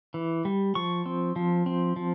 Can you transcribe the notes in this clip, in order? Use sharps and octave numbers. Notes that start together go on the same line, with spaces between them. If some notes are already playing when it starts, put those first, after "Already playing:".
E3
G3
F3 C#6
C4
F3
C4
F3